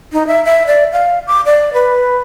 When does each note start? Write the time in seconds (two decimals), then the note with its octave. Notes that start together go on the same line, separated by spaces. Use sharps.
0.13 D#4
0.27 E5
0.45 E5
0.67 D5
0.92 F5
1.27 D6
1.46 D5
1.73 B4